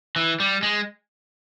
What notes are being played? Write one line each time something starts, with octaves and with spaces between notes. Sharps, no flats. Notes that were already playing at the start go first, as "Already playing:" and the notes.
E3
G3
G#3